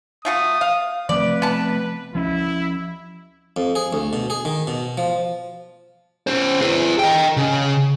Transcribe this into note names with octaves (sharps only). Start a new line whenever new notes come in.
A3 F4 F#4 D#6
F5
F3 A3 C4 B4 D5
B3 A5
F3 C#4 E4
F2
G#4
D2
B2
G#4
D#3
B2
F3
C#4 C5
G#4 B4
D#5 G5
C#3